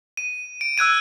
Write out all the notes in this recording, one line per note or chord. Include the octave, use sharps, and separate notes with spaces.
D#7
D7
E6 F#6 G#6 D#7